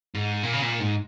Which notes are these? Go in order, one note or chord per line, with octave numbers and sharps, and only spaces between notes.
G#2
A#2
C#3
A#2
G#2